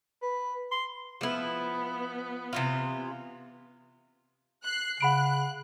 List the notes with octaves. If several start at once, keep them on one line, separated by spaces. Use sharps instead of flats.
B4
C6
F3 B3 E4
C3 E3 F4
F#6 C7
C#3 F#5 B5 F#6 D7